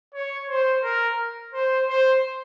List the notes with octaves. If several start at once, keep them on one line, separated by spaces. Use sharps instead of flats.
C#5
C5
A#4
C5
C5